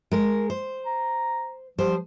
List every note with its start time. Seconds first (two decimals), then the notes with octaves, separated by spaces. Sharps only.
0.12 G#3 A#4
0.50 C5
0.86 A#5
1.78 F3 G3 C5